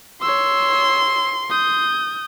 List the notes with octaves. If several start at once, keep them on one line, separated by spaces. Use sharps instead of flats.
C#5 C6 E6
D#6 G6